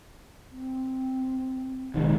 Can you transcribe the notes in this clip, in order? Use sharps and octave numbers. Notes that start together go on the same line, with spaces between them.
C4
A#1 C3 D#3 G#3